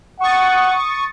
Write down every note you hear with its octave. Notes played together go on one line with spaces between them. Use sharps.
F#5 C#6 D#6 A6